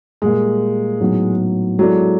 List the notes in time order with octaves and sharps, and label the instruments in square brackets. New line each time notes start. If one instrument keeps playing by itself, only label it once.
[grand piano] A#2 G3 A#3 [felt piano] G#3
[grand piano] A2 F#3 B3 D#4
[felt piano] F#3 [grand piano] G#3 B3 E4 A4 D5